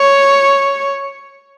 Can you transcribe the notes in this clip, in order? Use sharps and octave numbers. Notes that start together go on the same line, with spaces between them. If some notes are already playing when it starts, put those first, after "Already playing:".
Already playing: C#5